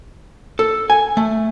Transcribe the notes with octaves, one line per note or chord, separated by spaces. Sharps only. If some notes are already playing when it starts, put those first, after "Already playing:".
A4
G#5
A3